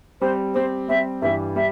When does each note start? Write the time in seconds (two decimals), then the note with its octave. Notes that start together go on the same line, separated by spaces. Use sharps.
0.21 G3 C4 G4 C5
0.54 G3 C4 G4 C5
0.88 G3 C4 G4 E5
1.22 G2 E3 G3 E5
1.56 G3 E5